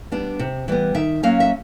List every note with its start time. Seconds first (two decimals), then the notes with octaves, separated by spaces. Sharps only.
0.12 G3 B3 D4
0.39 C3
0.68 E3 G3 B3
0.94 D#3 E5
1.23 F#3 A#3 C#4 F5
1.40 E5